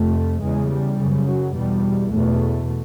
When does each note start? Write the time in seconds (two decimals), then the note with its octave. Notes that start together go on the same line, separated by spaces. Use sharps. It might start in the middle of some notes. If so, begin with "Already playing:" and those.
Already playing: F2 C3 A3
0.41 E2 C#3 G#3
0.69 G3
0.98 F#2 C#3
1.26 F#3
1.54 E2 B2 G3
2.11 E2 B2 A3